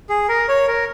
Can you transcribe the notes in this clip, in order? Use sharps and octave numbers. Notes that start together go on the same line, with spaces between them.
G#4
A#4
C#5
A#4